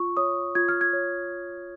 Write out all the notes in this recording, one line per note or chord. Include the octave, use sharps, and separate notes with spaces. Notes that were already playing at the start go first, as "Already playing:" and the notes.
Already playing: F4 C#6
C#5 D#6
F4 G#6
F6
G#6
C#5